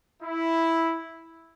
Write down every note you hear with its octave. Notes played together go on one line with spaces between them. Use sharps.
E4